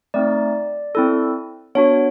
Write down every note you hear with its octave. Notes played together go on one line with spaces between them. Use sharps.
A3 C4 D#4 D5
C4 E4 A4
B3 D4 F#4 C#5